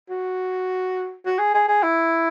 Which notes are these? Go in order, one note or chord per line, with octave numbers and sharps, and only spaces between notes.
F#4
F#4
G#4
G#4
G#4
E4